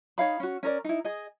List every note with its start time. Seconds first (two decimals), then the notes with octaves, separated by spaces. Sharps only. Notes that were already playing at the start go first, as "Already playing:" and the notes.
0.18 D#4 C#5 F5 B5
0.40 C#4 F#4
0.63 C#4 A#4 D5
0.84 D#4 E4
1.05 G#4 D#5